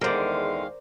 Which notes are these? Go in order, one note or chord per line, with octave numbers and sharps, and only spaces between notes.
E2 D3 D#3 G#3 A#4 C5 D5 F5